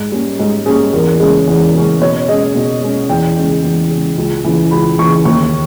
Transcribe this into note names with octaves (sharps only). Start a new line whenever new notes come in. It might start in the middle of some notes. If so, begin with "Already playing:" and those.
Already playing: G#2
G3 A#3 C#4
G#2 G#4
G3 A#3 C#4 G#4
E2 A#4
C#3 G#3 C#4
E2
C#3 G#3 C#4
B2 C#5
G#3 C#4 D#5
B2
G#3 C#4
E2 G5
C#3 G#3 C#4
E2
C#3 G#3 C#4
C#2
C#3 E3
C#2 B5
E3 C#6
C#3
D#2 C#6